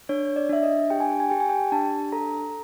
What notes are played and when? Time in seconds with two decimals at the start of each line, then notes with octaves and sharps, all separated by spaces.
0.09 D4 C#5
0.36 D5
0.49 D4 E5
0.63 D#5
0.90 G4 G5
1.00 G#5
1.10 G5
1.20 G#5
1.30 G4 G5
1.40 G#5
1.49 G5
1.72 D4 A5
2.12 A4 A#5